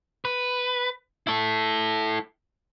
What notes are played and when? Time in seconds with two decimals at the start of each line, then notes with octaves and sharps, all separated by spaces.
0.25 B4
1.27 E4 A4